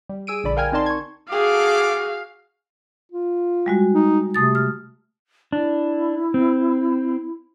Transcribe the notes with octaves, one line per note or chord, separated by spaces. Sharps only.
G3
G#4 E6 D7 D#7
A#1 D3 D5 B5
A#4 F5 G5 G#5 F6 G#6
C4 D#4 A#4 D5 A5 C6
C#6 G#6
F#4 G#4 A4 F5 D6
F4
G3 G#3 F#4
D#4
C3 A3 D#6 A6
F6
D4 E4
C4